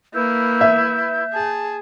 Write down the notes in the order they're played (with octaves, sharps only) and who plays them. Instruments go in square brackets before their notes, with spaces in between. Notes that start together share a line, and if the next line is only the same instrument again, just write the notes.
[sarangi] A#3 [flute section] E4 B4 [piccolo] G6
[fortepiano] E5
[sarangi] G#4 [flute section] A5